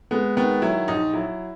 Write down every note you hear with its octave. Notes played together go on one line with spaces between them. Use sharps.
G#3 B3
D#3 B3
F#3 E4
A#1 D#4
F#3 E4